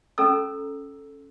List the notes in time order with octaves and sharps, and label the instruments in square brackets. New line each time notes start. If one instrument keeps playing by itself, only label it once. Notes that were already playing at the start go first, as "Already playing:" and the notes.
[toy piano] C#4 A4 A#5 E6